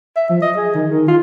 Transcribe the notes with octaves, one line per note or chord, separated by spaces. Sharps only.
E5
F3
D#5
G#4
D#3
D#3
F4